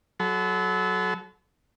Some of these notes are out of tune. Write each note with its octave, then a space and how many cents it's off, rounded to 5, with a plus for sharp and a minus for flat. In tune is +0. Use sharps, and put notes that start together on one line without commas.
F#3 +0 A4 -30 B5 +45